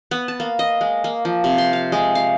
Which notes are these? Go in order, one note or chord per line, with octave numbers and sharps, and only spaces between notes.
B3
A5
A#3
D#5
G#3
A#3
F3
C3
C6
F5
G#3
F5